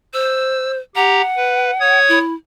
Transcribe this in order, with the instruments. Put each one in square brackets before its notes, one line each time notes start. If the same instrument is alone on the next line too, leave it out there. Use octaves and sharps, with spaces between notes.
[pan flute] C5 [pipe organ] E6
[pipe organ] G4 A#5 [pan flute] F#5
[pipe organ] B4
C#5 D#6 G#6
[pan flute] E4